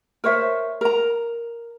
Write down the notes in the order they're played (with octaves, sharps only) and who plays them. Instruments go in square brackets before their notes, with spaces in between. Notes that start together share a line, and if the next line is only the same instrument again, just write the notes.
[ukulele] A#4 C5 C#5 E5
A#4 A#5